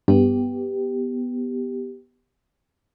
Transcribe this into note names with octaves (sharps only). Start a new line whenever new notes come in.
G2 B3 G4